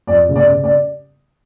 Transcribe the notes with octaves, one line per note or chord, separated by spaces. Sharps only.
F2 D5
C#3
D5
C#3
D5